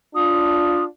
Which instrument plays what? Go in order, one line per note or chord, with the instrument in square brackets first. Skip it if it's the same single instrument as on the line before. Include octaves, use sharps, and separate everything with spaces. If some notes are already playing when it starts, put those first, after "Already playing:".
[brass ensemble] D4 F4 [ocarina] D#6